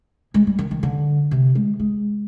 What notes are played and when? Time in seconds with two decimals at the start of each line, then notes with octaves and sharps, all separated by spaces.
0.34 G#3
0.47 G3
0.59 D#3
0.71 D#3
0.83 D3
1.31 C3
1.55 G#3
1.80 G#3